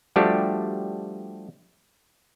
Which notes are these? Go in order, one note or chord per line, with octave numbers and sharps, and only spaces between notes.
F3 G3 A3 D4 F#4 G4